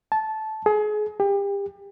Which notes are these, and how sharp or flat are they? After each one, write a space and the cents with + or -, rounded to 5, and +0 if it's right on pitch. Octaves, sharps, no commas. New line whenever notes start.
A5 -15
G#4 +30
G4 +30